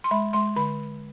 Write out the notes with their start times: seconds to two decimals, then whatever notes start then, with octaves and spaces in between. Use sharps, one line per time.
0.04 C6
0.11 G#3 B5
0.33 G#3 C6
0.56 D3 B5